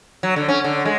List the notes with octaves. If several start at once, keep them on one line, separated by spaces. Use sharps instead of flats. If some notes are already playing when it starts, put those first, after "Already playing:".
F#3
D3
C#4
D3
G#3